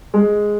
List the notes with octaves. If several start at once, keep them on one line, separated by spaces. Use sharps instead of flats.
G#3